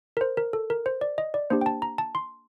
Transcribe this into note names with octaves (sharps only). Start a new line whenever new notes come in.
A#4
C5
A#4
A4
A#4
C5
D5
D#5
D5
A#3 D4 G4 C5
G5
A5
A#5
A5
C6